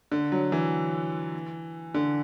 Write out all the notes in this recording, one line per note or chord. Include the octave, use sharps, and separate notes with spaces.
D3
F#3
E3
D3